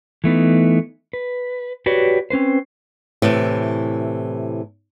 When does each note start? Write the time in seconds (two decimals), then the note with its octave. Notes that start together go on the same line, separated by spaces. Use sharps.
0.24 E3 A3 B3 D#4
1.13 B4
1.86 F#4 G4 B4 C#5 D5
2.30 C4 C#4 B4 C5
3.22 A2 C3 E3